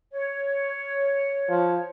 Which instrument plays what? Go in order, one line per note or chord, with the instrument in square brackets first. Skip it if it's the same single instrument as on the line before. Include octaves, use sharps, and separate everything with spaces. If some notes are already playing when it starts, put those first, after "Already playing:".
[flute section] C#5
[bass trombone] F3